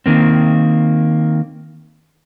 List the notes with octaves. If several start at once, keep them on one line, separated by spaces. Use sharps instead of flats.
D#3 A#3 C4